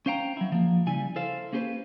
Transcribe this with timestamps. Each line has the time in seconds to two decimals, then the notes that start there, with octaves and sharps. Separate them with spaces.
0.06 C#4 C5 F5 G5 A#5
0.37 F#3 E4
0.52 F3 A#3
0.87 C#3 G3 E4 G#5
1.16 E4 A4 C5 F5
1.53 A#3 C#4 G4 G#4 B4 C5